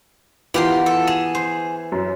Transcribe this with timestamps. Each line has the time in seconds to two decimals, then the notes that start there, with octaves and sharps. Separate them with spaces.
0.54 E3 B3 F4 G4 A#4 C6
0.86 A4
1.08 G#4 E7
1.35 C5
1.92 F#2